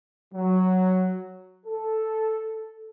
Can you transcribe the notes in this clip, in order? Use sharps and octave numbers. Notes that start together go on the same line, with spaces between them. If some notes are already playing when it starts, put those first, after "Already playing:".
F#3
A4